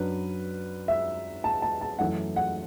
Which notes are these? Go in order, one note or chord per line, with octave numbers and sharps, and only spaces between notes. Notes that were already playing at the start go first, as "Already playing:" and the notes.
Already playing: F#2 F#3 D4 B4
E5
A5
A5
A5
F#2 E3 A3 E4 F#5
F#5